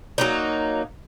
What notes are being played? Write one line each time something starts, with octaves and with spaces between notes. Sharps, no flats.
F#3 A#3 D#4